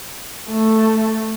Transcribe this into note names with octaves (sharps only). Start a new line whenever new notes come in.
A3